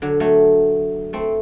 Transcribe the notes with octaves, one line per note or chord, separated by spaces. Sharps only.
D3 F#3
F#3 A3
A3 C4